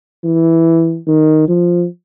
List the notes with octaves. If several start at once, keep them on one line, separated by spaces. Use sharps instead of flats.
E3
D#3
F3